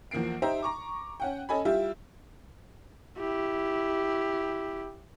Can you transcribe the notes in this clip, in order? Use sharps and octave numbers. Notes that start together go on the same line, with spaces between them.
E2 F3 A#3 C7 D7
D#4 G4 C5 E5 G5 A#5
A#5 C#6 D6
C#4 F#5 G5
C#4 A4 D#5 G#5 B5
G3 E4 F4 G4 E5
E4 G4